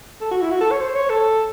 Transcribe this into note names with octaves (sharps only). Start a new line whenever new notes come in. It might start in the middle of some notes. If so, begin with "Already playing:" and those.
A4
F#4
E4
F#4
A4
C#5
C5
C#5
A4